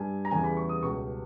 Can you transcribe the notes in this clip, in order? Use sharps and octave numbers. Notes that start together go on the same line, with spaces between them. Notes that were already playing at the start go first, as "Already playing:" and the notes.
Already playing: G2 G3 G#5
A#5
E2 C#3 E3 G3 G#5
B5
C#6
D#6
C#2 B2 G3 C#6